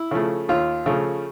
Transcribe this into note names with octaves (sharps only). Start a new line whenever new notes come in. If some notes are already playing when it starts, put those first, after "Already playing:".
Already playing: E4
C#3 F3 A3
D#2 F4
C#3 F3 A3